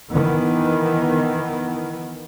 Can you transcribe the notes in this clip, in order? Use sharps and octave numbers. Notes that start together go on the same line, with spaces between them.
D#3 E3 B3